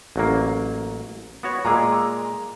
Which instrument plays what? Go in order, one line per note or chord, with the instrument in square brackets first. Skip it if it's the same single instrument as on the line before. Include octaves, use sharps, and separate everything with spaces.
[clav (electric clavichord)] A1 F#3 A#3
B3 F#4 C#5
[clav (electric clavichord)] A#2 G#3 G#4 [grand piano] A#5 D6 E6